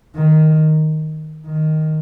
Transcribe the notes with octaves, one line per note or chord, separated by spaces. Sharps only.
D#3
D#3